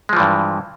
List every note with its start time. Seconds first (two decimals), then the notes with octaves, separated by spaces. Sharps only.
0.09 G#3
0.13 F3
0.16 E3
0.20 G2